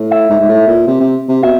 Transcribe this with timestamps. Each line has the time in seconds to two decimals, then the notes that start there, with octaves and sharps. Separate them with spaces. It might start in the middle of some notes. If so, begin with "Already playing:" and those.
Already playing: A2
0.11 E5
0.29 G#2
0.39 G#2
0.49 A2
0.67 A#2
0.87 C3
1.00 C3
1.28 C3
1.43 B2 E5